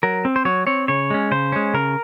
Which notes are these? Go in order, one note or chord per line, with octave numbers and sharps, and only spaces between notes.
F#3 A#4
C4
C5
F#3 C#5
C4 C#5
C#3 C#5
G#3 C#4
C#3 C5
G#3 C#4
C#3 A#4